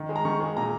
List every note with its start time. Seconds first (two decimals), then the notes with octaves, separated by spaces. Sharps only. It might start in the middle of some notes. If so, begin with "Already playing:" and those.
Already playing: D#3
0.09 G#3
0.16 A#5
0.25 D#3 C#6
0.40 G#3
0.57 A#2 A#5